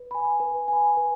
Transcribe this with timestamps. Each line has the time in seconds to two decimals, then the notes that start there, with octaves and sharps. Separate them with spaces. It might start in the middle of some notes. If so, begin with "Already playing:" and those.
Already playing: B4
0.11 G#5 B5
0.40 B4
0.68 G#5 B5
0.97 B4